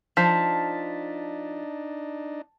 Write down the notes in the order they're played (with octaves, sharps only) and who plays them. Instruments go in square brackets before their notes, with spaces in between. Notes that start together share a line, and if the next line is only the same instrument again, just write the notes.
[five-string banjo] F3 [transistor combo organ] D4 D#4 [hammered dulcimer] A5 [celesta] B6